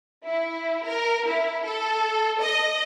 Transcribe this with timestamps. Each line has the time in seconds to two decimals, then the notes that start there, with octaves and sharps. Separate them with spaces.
0.24 E4
0.85 A#4
1.27 E4
1.65 A4
2.40 D#5